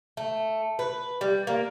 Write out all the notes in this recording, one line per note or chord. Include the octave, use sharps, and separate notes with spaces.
A3
B4
G3
A#3